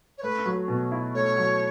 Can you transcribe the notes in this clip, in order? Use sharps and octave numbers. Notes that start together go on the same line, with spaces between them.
C#5
A3 B4
F#3
B2
E4
A3 C#5
F#3